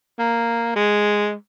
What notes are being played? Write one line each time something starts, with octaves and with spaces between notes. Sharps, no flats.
A#3
G#3